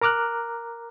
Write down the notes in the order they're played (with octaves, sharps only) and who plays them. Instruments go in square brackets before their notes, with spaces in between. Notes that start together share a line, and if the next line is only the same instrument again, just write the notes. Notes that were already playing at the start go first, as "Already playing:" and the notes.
[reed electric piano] A#4 A#5 D6 F6 F#6